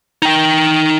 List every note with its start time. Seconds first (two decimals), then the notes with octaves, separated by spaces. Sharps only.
0.22 D#4 G5